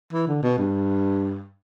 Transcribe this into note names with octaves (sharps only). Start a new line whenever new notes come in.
E3
D3
B2
G2